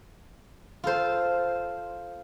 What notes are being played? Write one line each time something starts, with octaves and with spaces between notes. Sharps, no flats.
F4 A4 C5